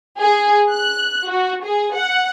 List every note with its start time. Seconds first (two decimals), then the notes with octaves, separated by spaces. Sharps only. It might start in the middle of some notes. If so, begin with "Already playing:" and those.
0.20 G#4
0.70 F#6
1.29 F#4
1.65 G#4
1.96 F#5